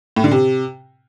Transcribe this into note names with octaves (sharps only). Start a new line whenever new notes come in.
A2
D3
C3